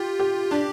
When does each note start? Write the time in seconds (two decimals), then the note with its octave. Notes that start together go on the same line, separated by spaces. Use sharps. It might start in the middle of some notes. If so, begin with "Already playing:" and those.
Already playing: F4 G4
0.19 G4
0.51 D4 G4